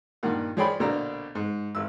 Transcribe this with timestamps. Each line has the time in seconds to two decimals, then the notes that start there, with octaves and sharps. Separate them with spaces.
0.23 G2 A#2 D#3 F#5
0.57 F3 G#4 C#5 D5 G5 B5
0.80 A#1 B2 D3 D5 A#5
1.35 G#2
1.75 G#1 E6